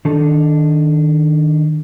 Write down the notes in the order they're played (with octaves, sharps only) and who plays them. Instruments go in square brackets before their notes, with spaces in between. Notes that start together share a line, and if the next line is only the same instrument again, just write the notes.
[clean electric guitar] D#3 D4 D#4 A4